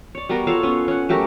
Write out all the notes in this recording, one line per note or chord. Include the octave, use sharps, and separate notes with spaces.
C#5 D5
G3 B3 F#4 A#4
F4 A4 C#5 F5
B3 C#4
C#4 F#5
F#3 A3 G4 A#4